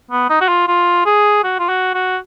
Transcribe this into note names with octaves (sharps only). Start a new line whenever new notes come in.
B3
D#4
F#4
F4
F4
G#4
F#4
F4
F#4
F#4